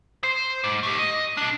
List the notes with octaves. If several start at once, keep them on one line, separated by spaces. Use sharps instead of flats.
C5
G#2
A3 G4
D#5
B1 D4